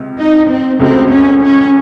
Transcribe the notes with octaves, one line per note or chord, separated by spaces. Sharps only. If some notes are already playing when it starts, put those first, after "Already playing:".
Already playing: C#2 C3
D#4
C4
C#2 C#3 F#3 A3 C4
C#4
C#4